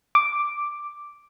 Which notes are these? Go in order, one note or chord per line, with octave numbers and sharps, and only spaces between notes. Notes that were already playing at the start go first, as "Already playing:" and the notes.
D6